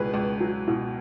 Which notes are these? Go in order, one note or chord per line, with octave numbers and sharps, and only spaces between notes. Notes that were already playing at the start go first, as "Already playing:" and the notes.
Already playing: C#2 B2 G#4 B4
C#2
F#3
B2